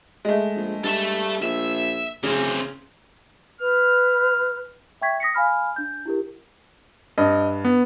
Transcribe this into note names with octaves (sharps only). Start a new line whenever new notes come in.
G#3 A3
A#1
G2 A4 E5
A#1 E5
D1 C#3 E3 C4
B4 F6
E5 G5 C#6 G#6 B6
D#6 A#6 B6 C#7
F5 G#5 B5 F6
D4 G6
E4 G4 A#4
G2 D#5
B3